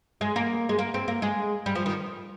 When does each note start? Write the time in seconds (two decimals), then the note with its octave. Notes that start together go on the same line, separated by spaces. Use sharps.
0.21 G#3
0.36 A#3
0.69 G#3
0.79 A#3
0.94 C4
1.08 A#3
1.22 G#3
1.66 G3
1.75 F3
1.86 D#3